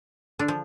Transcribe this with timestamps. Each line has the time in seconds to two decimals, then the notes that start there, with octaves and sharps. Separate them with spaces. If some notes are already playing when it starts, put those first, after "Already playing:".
0.39 D3 D4
0.48 F3